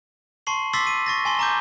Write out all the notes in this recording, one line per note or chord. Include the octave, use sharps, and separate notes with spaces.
A5 C6 C#6 C7 F#7
C6 D6 E6 A6 B6 C7
D#7
C#6 A6 A#6
G#5 A5 C6 G7
A#5 C#6 D6 G6